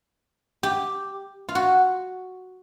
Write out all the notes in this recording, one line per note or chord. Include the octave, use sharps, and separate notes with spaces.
G4
F4
F#4